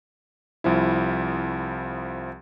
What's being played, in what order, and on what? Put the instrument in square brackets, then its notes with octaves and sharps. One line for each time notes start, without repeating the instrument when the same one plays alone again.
[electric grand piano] C2 F3 E4